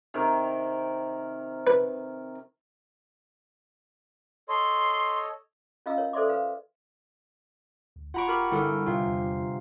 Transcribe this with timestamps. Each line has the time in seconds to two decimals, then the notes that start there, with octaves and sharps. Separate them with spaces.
0.14 C3 D#3 A#4
1.67 B4
4.49 A4 C#5 D#5 C6
5.86 C#4 F4 D#5 F5 A#5 E6
5.98 A#4 C#5
6.13 A4 C5 D5 E5 C6 D6
6.29 B4 F5
7.96 D2
8.14 E1 F4 F#5 A#5 B5 C#6 D7
8.28 G4 A#4 B5
8.51 G1 E4 A4 A#4
8.86 C2 C3 F4 F5
9.06 E2